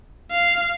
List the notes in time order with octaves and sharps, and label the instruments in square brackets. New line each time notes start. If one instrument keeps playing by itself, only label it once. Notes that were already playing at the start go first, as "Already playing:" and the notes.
[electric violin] F5